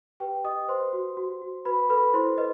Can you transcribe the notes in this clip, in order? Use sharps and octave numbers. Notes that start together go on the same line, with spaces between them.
G4 B4 G5
G4 D#5 D#6
B4 C5 C6
F#4
F#4
F#4
F#4 B4 B5
A4 B4 B5
E4 C5 C6
B4 D#5